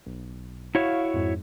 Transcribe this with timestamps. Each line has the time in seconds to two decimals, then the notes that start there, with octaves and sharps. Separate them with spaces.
0.06 B1
0.75 E4 F#4 C#5 F5
1.14 F2 G#2